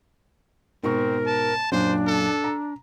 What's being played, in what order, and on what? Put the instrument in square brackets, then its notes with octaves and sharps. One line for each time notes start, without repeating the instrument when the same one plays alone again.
[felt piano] G#2 B2 C#6 [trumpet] C4 [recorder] A#4
[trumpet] A5
[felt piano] F#2 A#2 [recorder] D4 [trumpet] C5
[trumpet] A4
[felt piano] A#5